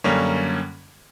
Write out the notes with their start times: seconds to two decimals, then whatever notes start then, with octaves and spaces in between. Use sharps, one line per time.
0.04 F#2 D3 G3 A#3 C#4